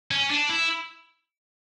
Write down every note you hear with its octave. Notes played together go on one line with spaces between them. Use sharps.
C#4
D4
E4